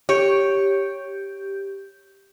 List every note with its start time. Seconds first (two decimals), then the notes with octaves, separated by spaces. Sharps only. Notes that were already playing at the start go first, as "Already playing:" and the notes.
0.09 G4 C#5 G6